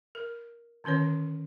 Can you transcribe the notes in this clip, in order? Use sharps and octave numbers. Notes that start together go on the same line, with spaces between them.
A#4
D3 D#3 C#4 B4 C#5